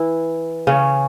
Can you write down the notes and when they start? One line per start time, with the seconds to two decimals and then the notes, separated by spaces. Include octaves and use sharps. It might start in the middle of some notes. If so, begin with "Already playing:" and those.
Already playing: E3 E4
0.67 C#3 C#4